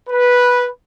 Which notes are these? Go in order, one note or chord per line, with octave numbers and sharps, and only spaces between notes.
B4